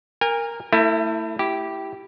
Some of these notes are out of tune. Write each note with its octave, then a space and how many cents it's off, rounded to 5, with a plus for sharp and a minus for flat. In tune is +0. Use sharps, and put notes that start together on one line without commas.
A#4 +0 G#5 -35
A3 +30 E4 +0
E4 +0 G4 -10